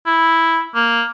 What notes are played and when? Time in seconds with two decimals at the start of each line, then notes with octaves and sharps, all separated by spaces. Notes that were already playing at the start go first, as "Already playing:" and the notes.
0.06 E4
0.75 A#3